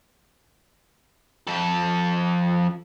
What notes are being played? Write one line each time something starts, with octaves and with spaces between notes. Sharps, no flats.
F2 A4